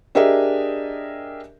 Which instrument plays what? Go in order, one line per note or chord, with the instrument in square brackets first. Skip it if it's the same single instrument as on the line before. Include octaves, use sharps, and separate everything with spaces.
[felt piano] D4 G4 G#4 A#4 D#5 E5